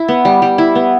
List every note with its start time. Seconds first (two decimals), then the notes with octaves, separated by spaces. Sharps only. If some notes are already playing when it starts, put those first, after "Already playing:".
Already playing: E4
0.08 B3
0.25 G3
0.42 G3
0.58 E4
0.75 B3